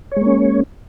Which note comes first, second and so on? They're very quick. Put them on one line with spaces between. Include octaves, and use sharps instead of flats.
C#5 G#3 A#3 C#4